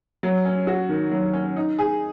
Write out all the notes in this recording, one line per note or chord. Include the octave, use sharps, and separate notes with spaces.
F#3
C#4
F#4
D#3
F#3
C#4
D#4
G#4